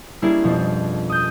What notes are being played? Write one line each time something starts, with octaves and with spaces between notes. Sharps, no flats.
G3 A#3 C#4 D4 E4 G#4
F2 B2 F3
D#6 G6